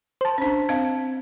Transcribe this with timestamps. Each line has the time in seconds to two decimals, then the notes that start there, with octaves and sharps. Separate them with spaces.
0.21 C5 A5
0.38 C#4 D4
0.69 C4 D#5 F5